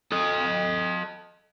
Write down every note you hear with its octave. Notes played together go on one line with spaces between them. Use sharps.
A4 D#5